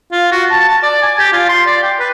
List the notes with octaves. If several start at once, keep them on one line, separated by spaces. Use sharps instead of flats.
F4
F#4
A5
A5
D5
G#5
G4
F4
C6
D5
G5
B4